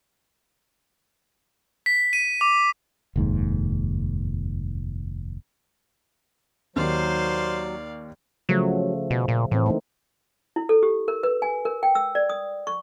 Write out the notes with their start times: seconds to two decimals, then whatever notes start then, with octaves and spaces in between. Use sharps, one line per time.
1.86 B6
2.13 D#7
2.41 D6
3.16 F1 D#2 G#2
6.76 D#2 D#3 F#3 C5 D5 F5
8.49 C#3 F3 F#3 A3
9.10 B2
9.28 A#2
9.51 A2 E3 C4
9.66 A3 A#3 D#4
10.56 E4
10.69 A4
10.83 G4
11.08 A#4
11.23 B4
11.42 G#5
11.65 A#4
11.83 G5
11.95 E6
12.15 D5
12.29 D#6
12.67 C#6